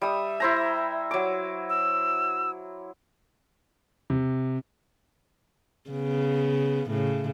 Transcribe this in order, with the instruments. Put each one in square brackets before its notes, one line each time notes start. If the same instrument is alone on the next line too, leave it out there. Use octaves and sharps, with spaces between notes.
[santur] G3 D#6 [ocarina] E5
[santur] E4 C5 A#5
F#3 D6
[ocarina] E6
[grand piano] C3
[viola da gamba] C#3 B3
A2 C#3